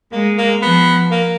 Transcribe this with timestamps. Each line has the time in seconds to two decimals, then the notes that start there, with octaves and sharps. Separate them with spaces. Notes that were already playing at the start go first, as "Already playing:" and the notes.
0.12 G#3 A#3
0.37 A#3
0.62 F3 B3
1.11 A#3